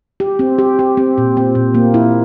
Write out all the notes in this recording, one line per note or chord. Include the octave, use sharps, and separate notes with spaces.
G4
C4
G4
G4
C4
A#2
C4
A#2
A#3
E4